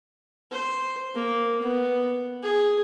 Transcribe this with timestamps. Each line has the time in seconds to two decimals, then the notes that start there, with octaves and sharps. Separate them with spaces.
0.52 C5
1.15 A#3
1.61 B3
2.43 G#4